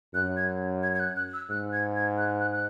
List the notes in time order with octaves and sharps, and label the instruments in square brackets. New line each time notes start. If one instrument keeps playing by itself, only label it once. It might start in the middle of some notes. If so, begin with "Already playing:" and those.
[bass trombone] F#2 [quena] F#6
[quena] G#6
G#6
G#6
F#6
F#6
E6
[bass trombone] G#2 [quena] F#6
[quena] G#6
G#6
F#6
F#6
F#6